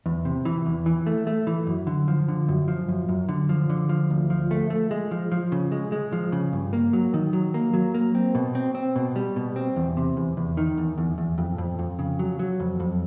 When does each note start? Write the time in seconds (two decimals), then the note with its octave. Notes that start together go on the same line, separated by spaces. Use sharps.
0.06 E2
0.25 C3
0.45 E3
0.66 E2
0.86 E3
1.06 A3
1.27 A3
1.47 E3
1.67 F#2
1.87 D3
2.08 F3
2.28 D3
2.48 F#2
2.68 F3
2.89 F#2
3.09 F#2
3.29 D3
3.49 F3
3.70 D3
3.89 F3
4.10 D2
4.30 F3
4.51 A3
4.70 A3
4.91 G#3
5.11 F3
5.32 F3
5.52 C#3
5.72 G#3
5.92 G#3
6.13 F3
6.32 C#3
6.53 G2
6.73 A#3
6.93 F#3
7.14 D#3
7.33 F#3
7.54 A#3
7.74 F#3
7.94 A#3
8.15 C4
8.35 B2
8.55 C4
8.75 C4
8.96 B2
9.16 G3
9.36 B2
9.56 C4
9.76 E2
9.97 C3
10.17 E2
10.37 E2
10.57 D#3
10.78 E2
10.98 E2
11.18 E2
11.38 F2
11.58 F2
11.79 F2
11.99 C#3
12.19 F#3
12.39 F#3
12.60 F2
12.80 F2